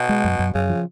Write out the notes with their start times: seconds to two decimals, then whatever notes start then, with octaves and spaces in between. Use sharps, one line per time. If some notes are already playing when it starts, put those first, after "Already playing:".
Already playing: B2
0.09 G#3
0.24 F#2
0.39 F#2
0.54 F#2 C#3
0.69 F3